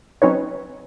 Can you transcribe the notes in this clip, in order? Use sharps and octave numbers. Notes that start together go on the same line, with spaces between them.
F#3 C4 C#4 D#4 B4 C#5